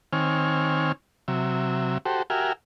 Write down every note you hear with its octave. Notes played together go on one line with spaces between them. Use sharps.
D#3 C4 C#5 G#5 F6
C3 F#3 E5
F#4 G4 A4 C5
F#4 G4 A#4 E5 G#5 F6